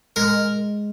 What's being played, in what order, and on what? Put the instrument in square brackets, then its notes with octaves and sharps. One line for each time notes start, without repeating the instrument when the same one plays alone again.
[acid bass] G#3 [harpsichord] A#4